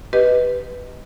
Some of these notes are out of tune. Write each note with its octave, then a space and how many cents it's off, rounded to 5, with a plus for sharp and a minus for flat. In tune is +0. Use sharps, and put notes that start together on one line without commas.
G4 +0 B4 +0 D#5 +5